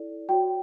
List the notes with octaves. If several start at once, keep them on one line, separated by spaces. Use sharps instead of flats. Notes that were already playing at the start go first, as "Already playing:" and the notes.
Already playing: E4 A4 D5
F#4 C#5 G5